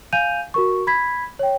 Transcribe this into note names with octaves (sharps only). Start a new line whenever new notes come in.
F5 G#5 G6 D#7 F7
F#4 A#4 C#6
B5 G#6 B6
C#5 G5